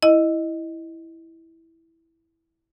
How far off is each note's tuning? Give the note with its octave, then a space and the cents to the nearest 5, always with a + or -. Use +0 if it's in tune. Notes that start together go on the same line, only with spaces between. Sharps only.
E4 -5 D#5 +0